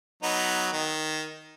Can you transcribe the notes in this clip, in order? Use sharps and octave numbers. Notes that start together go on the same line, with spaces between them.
F#3 B3 D#4
D#3